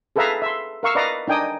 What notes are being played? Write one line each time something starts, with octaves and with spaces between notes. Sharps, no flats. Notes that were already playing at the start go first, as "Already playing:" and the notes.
G#4 A4 B4 E5 F5 A#5
E5 C6
A#4 F5 C#6 E6
B4 D5 D#5 F5 A#5
D4 D#4 G5 G#5 D#6